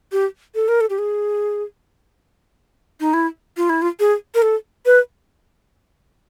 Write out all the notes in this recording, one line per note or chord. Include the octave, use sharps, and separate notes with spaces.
G4
A4
A#4
A4
G4
G#4
D#4
E4
F4
E4
F4
G#4
A#4
A4
B4